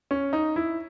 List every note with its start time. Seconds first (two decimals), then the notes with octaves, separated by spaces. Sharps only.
0.11 C#4
0.33 D#4
0.56 E4